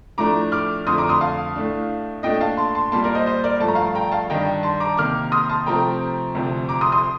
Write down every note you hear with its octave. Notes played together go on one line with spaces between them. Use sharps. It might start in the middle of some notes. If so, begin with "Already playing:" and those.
A2 F3 A3 D4 A#5 D6
D6 F6
F2 D3 A3 C6 D#6
A#5 D6
C6 D#6
F5 A5
A2 A3 D4
A#2 A3 D4 D#5 G5
F5 A5
A5 C6
A5 C6
A#2 G3 A#3 A5 C6
A#4 D5
C5 D#5
C5 D#5
A#4 D5
G2 F3 A3 A5
A#5
F5 A5
G5 A#5
F5 A5
G2 D#3 G3 D4 D#5 G5
A5 C6
A#5 D6
C3 D#3 A#3 D6 F6
C6 D#6
A5 C6
C3 F3 A3 C4 G5 A#5
D2 C3 F3 C4
A#5 D6
C6 D#6
C6 D#6